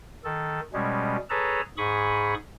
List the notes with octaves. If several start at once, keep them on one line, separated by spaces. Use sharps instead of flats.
D#3 A4
B2 G3 G#3 C#4
G#4 A4 B4 C#5 A5 A#5
G#2 G#4 B5 C#6 D#6